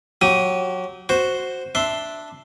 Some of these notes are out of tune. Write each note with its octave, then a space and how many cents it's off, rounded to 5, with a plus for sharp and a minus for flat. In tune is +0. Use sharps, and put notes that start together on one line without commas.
F#3 -15 G4 -30 D#6 +0
F#4 +0 C5 +0
D4 +0 E5 +0 C6 +0